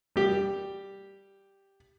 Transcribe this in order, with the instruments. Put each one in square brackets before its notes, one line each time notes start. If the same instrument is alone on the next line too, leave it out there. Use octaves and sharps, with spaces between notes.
[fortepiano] G3 G4